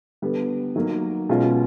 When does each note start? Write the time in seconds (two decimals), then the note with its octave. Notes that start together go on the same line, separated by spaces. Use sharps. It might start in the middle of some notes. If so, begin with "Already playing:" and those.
0.22 D3 G3 B3
0.76 D#3 F#3 A#3
1.29 B2 G#3 C#4 F4